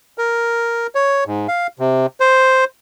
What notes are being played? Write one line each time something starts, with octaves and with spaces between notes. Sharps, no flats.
A#4
C#5
G#2
F5
C3
C5